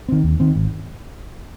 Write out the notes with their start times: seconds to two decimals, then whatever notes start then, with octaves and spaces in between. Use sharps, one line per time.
0.09 D#3 C4
0.24 D#2
0.40 D#3 C4
0.56 G#1